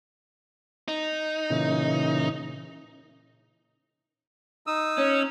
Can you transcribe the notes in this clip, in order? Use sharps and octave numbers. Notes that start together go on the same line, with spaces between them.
D#4
A#2 C#3 E3
D#4 D#6 E6
C#4